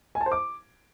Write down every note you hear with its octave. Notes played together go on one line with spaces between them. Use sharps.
G#5
A5
C5
D6